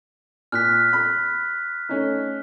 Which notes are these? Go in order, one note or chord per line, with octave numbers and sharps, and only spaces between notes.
A#2 F6 F#6 B6
B5
A3 C#4 D#4